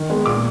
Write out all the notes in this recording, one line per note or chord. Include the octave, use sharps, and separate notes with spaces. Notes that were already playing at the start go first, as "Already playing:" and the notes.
Already playing: D#3
G#3 B3
A#2 D6